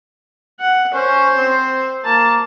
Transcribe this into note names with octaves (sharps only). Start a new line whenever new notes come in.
F#5
C#4 C5
C4
A#3 A5